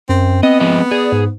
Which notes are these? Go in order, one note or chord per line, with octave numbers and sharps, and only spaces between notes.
F#2 C4
B3 C4 D#5
F3 G#3 D#5
G#4 D5
G#2